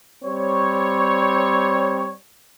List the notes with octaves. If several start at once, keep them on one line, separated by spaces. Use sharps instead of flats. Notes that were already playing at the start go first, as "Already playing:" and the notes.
G3 C4 C#5